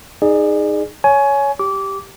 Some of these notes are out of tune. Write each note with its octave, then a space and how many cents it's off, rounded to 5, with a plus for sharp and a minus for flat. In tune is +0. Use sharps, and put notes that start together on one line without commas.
D#4 +0 G#4 +0 D5 +35
C#5 +10 G#5 +20
G4 +0 D6 -20